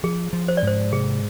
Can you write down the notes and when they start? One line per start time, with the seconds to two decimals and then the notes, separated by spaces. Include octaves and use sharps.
0.04 F3 G#4
0.33 F3
0.48 C5
0.57 D5
0.63 G#2 C5
0.92 C3 G#4